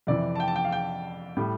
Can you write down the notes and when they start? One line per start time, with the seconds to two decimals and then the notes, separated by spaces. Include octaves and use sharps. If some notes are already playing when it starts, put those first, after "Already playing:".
0.07 F2 C3 E3 D5
0.35 A5
0.40 G5
0.48 A5
0.56 G5
0.64 F5
0.72 G5
1.37 A2 G3